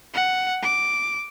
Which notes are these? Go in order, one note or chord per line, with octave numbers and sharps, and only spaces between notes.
F#5
D6